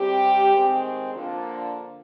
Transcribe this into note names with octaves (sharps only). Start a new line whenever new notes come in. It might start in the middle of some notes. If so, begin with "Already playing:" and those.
Already playing: C3 G3 C4 G4
D#3 G#3 C4
D3 F3 A#3